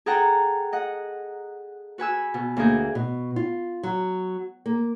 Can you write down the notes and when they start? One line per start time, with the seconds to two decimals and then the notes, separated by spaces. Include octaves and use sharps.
0.06 G#4 A4 F#5 G5 A#5
0.72 D#5 F#5
1.98 F#4 B4 G#5 E6
2.34 B2
2.57 D2 A#3 G#4 G6
2.95 B2
3.36 F4
3.83 F#3
4.66 A#3